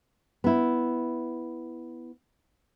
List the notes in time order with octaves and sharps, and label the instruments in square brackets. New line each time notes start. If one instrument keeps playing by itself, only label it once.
[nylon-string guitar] B3 E4